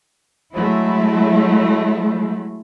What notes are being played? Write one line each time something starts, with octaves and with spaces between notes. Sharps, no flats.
F#3 G#3 A3 E4